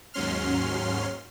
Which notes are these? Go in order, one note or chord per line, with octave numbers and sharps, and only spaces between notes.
D#2 G#2 F#3 C#4 C6 F6